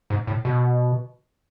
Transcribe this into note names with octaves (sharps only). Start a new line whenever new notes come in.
G#2
A2
B2